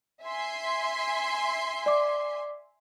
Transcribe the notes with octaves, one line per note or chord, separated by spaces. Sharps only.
E5 G#5 C6
D5 D6